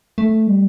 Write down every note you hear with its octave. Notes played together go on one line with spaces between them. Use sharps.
A3
G3